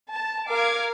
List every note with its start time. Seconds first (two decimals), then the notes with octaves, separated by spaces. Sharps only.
0.13 A5
0.49 A#4 F5 D6 G#6